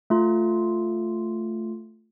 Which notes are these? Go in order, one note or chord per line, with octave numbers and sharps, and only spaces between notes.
A3 F4